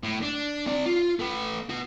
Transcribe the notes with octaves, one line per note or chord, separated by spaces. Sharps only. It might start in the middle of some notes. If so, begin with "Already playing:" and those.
A2
D4
C4 D5
F4
A3 B4
B3 F#4